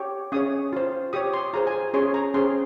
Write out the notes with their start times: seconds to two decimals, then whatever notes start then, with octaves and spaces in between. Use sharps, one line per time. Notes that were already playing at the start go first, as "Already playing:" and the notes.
Already playing: G4 C#5
0.32 C#4 G#4 C#5 D#6
0.73 F4 C5
1.13 G4 C#5 D#6
1.34 C6
1.53 F4 G#4 C5 A#5
1.67 G#5
1.94 C#4 G#4 C#5 C6
2.14 A#5
2.34 C#4 G#4 C5 C6